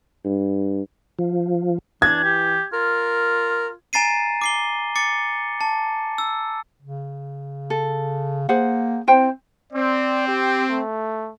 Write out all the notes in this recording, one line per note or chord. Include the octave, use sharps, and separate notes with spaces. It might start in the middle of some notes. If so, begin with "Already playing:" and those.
G2
F3
E3 D4 G#6
G4
F4 A#4
G#5 A#5 A6 C7 D#7
D6 C7 G7
D6 A6 C#7
A5
E6
C#3
A4
A#3 G#4 C5 F#5
C4 E4 C5 G5
C4 D5
G4
A3